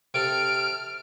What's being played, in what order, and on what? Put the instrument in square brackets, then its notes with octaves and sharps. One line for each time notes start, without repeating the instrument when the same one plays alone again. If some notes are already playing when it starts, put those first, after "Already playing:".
[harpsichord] C3 A4 [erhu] F6 [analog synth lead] D7